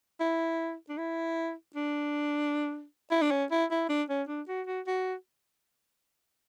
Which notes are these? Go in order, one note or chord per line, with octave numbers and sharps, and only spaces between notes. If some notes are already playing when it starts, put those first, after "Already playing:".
E4
D4
E4
D4
E4
D4
C#4
E4
E4
D4
C#4
D4
F#4
F#4
F#4